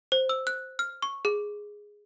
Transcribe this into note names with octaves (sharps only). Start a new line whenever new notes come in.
C5
E6
F#6
F6
C#6
G#4